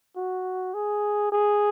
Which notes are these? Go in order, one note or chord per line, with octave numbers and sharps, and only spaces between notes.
F#4
G#4
G#4